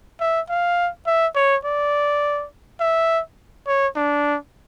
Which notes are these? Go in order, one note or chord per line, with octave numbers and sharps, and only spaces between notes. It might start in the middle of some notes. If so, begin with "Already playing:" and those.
E5
F5
E5
C#5
D5
E5
C#5
D4